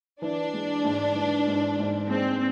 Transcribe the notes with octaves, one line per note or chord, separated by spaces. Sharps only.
E3 D4
G#3
G#2
E3
G#2
G#2
G#3 C4